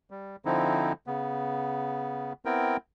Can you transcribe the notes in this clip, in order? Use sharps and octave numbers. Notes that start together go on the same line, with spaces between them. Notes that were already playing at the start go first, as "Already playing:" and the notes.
G3
D3 F3 C4 D#4 E4
C#3 B3
B3 C4 E4 A#4 G5